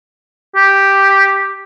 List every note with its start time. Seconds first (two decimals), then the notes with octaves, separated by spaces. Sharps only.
0.56 G4